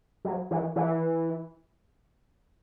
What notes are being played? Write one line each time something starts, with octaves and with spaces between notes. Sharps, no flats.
F#3
E3
E3